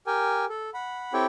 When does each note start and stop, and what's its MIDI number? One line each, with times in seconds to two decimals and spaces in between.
0.07 0.45 67
0.07 0.45 70
0.07 0.45 79
0.07 0.45 80
0.49 0.70 69
0.74 1.13 78
0.74 1.13 83
1.13 1.26 60
1.13 1.26 64
1.13 1.26 67
1.13 1.26 69
1.13 1.26 73
1.13 1.26 79